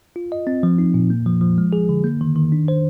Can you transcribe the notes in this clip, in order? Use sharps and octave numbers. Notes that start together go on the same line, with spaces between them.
F4
D#5
C4
F3
D#4
A#2
A#3
F3
F3
G#3
G#4
D3
A#3
D#3
D#3
D4
C5